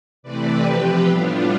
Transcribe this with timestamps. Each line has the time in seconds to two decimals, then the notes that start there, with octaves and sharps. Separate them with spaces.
0.23 C3 E3 A3 C4 B4 D5
0.64 C3 F3 C4 G4 B4
1.05 A2 G3 B3 D4 F4